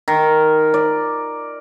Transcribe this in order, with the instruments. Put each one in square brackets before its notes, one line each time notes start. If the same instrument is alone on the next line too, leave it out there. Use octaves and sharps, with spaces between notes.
[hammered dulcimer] D#3
D5